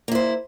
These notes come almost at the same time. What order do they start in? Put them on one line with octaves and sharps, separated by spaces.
A#3 E4 C5